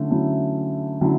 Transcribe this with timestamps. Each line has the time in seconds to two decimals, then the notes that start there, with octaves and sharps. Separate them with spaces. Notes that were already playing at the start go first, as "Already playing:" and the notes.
Already playing: D3 F#3 A3 C#4 E4
0.11 D3 F#3 A3 C#4 E4
1.01 D3 F#3 A3 C#4 E4